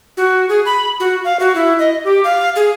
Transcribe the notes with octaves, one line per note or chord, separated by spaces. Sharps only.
F#4
G#4
B5
F#4
F5
F#4
E4
D#5
G4
F5
G#4